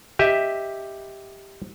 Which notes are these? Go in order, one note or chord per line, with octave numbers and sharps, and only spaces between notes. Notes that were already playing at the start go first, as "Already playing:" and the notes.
G4 D#5 E5